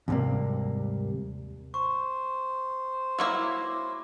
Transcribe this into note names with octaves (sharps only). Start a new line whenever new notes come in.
D#2 G#2 C3 G3 A#3
C5 C#6
F#3 A#3 E4 D6